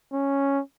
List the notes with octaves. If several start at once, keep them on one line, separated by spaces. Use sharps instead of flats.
C#4